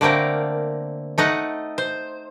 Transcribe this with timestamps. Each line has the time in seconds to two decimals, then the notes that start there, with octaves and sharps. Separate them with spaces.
0.01 D3 A3 A#3 C4 A#4
1.18 A3 D#4 D#5 F#5
1.78 C5